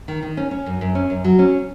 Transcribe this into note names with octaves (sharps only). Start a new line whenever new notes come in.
D#3
D#3
C#4
C#4
F#2
F#2
C#4
F#2
F#3
C#4